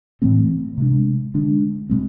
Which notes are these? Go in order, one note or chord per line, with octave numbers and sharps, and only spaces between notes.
A2 E3 A3 C4
C3 G#3 D4
D3 G#3 D4
B2 G#3 C4